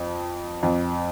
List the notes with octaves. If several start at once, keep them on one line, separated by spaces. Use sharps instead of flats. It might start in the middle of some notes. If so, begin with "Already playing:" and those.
Already playing: F2
F2